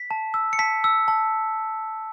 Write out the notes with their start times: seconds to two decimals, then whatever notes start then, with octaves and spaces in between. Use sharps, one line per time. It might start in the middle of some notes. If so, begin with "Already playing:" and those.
Already playing: B6
0.11 A5
0.34 E6
0.53 C#7
0.59 A5 B6
0.84 E6
1.08 A5